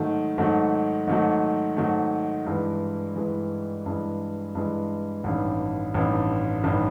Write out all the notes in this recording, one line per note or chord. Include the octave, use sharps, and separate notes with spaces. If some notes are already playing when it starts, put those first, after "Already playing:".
Already playing: G#2 D#3 F#3 A3
G#2 D#3 F#3 A3
G#2 D#3 F#3 A3
G#2 D#3 F#3 A3
G2 E3 G#3
G2 E3 G#3
G2 E3 G#3
G2 E3 G#3
A1 G2 D#3
A1 G2 D#3
A1 G2 D#3